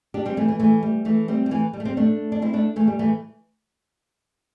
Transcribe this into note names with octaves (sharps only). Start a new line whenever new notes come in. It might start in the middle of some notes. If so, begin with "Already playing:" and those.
D4 G4
G3 C4
E3 A3
E3
E3 A3
G3
E3 A3
G3 C4
G3
E3 A3
G3
A3
G3 C4
A3 D4
D4
C4 E4
A3 D4
E3 A3
G3
E3 A3